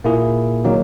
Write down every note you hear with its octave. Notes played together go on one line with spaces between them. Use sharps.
A#2 A#3 E4 G#4
D#3 F#3 A#3 D#4